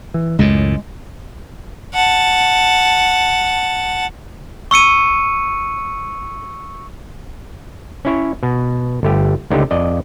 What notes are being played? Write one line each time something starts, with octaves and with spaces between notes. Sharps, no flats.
E3
C#2 F#2 A2 G#3
F#5 A5
C#6 E6 C#7 D#7
C#4 E4 C#5
B2
G1 A3 G4
C#2 D3 A3 D#4 G4
F2 D5 D#5